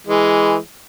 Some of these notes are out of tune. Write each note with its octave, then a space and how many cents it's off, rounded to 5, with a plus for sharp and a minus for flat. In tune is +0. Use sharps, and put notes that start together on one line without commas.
E3 +0 G#3 +0